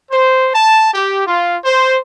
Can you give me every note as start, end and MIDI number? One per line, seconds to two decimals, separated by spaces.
0.11 0.49 72
0.55 0.89 81
0.94 1.24 67
1.27 1.57 65
1.65 1.97 72